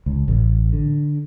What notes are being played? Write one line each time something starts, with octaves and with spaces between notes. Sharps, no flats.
C#2
A1
D3